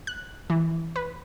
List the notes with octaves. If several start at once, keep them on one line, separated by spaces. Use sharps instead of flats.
F#6
E3
B4